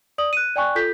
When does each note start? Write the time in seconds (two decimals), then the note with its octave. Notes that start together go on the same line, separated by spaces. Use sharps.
0.18 D5 D#6 F#7
0.33 F#6 D#7
0.56 D5 G5 G#5 C#6 F#6
0.75 F4 A4 G6 B6